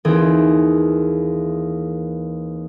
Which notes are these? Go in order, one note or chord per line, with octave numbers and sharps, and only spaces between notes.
D#2 E3 C4 G#4